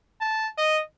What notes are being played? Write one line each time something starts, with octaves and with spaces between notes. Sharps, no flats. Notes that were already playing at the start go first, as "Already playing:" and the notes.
A5
D#5